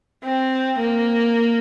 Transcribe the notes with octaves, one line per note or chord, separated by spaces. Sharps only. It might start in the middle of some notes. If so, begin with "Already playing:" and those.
C4
A#3